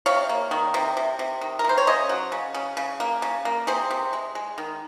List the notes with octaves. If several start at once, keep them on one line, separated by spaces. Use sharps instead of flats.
C3 C#5 F5
A#3
D#3
C3
C3
C3
D#3
A#4
C3 C5
C#5
C#3 C5 D#5
F#3
C#3
C#3
C#3
A#3
C#3
A#3
C3 G#4 C5
C3
G#3
G#3
D#3